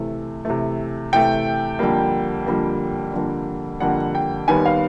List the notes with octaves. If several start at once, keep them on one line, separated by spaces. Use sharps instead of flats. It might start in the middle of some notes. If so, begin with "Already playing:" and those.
Already playing: C3 E3 A3
C3 E3 A3
C3 E3 A3 G5
F2 D3 G3 A#3
F2 D3 G3 A#3
F2 D3 G3 A#3
F2 D3 G3 A#3 F#5
G5
D#2 D#3 G3 B3 G#5
F5